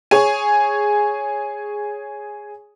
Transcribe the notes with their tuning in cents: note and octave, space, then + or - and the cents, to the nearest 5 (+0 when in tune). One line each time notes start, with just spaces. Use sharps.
G#4 +0 C#5 +0 G#5 +0